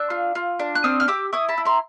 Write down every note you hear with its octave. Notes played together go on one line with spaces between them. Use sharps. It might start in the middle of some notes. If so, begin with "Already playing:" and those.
Already playing: D4 E6 F#6
F4
F4
D4
F#6
C4 D#6 F6
F6
G4 D6 E6
E4 C#6 D#6
A5 B5
E4
A#5 C6